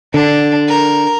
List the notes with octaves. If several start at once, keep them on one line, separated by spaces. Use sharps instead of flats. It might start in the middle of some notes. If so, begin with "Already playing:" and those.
D3 D4
A#4